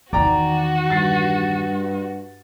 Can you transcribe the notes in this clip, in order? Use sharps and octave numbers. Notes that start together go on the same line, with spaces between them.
E2 D#3 F#4 D5 G5 A#5
G2 A6 C7